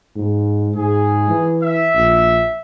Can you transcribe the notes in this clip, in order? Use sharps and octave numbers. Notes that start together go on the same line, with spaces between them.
G#2
G#2 G#4
E3
E5
A#1